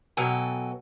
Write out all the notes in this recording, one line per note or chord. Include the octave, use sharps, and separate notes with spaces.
B2 F#3 A4 G5 G#5